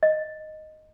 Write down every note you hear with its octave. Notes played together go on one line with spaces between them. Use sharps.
D#5